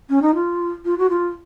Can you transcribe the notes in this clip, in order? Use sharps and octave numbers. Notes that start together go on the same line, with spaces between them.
C#4
D#4
F4
F4
F#4
F4